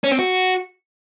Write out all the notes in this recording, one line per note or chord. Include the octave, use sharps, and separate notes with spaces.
C#4
C4
F#4